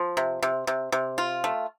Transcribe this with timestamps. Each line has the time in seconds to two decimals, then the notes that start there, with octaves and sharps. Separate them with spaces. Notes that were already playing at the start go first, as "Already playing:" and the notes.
Already playing: F3
0.17 C3
0.43 C3
0.67 C3
0.92 C3
1.18 F4
1.44 A3